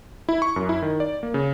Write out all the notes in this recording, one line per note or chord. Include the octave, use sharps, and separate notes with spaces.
E4
C#6
F#2
E4
D#3
D5
A#3
C#3